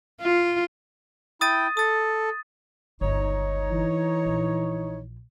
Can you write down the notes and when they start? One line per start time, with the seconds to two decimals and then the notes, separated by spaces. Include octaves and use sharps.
0.21 F4
1.41 E4 G5 D#6 A6 D#7
1.77 A4 D#6 A6
3.01 G1 C#2 D#4 C#5
3.71 E3
4.25 A#1